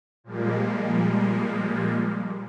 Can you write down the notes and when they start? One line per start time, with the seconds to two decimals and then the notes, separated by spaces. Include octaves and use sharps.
0.24 A#2 F3 G3 G#3 A#3